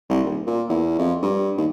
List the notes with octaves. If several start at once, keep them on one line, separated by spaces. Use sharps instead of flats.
C2
D#1
A#2
E2
F2
G2
D#2